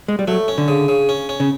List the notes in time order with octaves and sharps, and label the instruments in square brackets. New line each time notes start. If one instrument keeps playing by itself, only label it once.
[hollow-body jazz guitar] G#3
G3
[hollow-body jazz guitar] F#3 [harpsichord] A3
[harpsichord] C#4
[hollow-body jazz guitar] D3
[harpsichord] C#3
C#3
C#4
C#4
[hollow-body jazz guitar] C#3